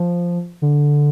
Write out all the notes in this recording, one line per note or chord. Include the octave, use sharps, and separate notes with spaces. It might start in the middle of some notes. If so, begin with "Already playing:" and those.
Already playing: F3
D3